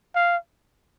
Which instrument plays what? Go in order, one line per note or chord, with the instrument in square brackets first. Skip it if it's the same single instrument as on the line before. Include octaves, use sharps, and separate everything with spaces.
[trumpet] F5